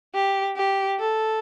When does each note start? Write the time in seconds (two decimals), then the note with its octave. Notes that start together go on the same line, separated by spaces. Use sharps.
0.14 G4
0.57 G4
0.99 A4